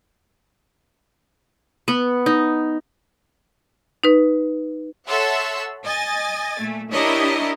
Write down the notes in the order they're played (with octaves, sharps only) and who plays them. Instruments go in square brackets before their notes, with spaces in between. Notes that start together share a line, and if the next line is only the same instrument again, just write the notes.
[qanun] B3
D#4
[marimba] D#4 B4
[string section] A4 C#5 E5 F#5 C6 E6
D#5 G#5 A6
A#2 A3
D4 E4 G4 A#4 C#5 D#5